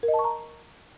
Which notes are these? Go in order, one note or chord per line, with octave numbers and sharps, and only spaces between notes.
A#4
D#5
A5
C#6
A#5